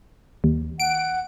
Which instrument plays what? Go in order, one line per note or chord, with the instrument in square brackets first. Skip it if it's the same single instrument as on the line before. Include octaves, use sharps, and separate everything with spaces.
[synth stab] D#2
[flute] F#5 [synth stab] D7